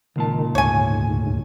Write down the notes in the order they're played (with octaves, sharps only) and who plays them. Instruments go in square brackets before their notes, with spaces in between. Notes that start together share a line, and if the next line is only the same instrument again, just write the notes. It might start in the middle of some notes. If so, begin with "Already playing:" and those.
[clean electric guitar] C#2 A#2 A5 [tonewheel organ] D#3
[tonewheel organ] D2 G#2 [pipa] C#5 G#5